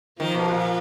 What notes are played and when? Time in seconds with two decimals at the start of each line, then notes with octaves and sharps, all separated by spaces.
0.20 D#3 F3
0.35 B2
0.48 A#2